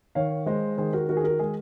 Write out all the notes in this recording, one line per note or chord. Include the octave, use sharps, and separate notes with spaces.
D#3 C#5 F5
G#3 C5 D#5
D#3 G#4 C5
F#4 A#4
D#3 F#4 A#4
G#4
F#4 A#4
G#3 G#4